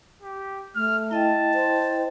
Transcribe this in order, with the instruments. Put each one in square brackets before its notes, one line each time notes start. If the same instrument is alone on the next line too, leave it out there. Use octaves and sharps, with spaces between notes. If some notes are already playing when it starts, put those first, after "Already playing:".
[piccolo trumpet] G4
[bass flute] A3 [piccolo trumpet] F6
[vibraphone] E4 D#5 G5 [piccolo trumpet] A5
[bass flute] C5